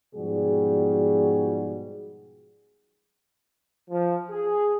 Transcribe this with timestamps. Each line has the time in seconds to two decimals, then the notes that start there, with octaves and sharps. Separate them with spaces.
0.15 G#2 B2 F3 G3 F#4 G#4
3.90 F3
4.30 G#4